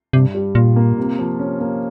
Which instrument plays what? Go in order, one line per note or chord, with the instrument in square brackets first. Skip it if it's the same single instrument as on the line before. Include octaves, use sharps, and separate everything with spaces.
[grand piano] G2 [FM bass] C3
[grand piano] G3
[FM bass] A#2 [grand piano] F4
[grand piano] A#3
C3
F3
C#4
A#3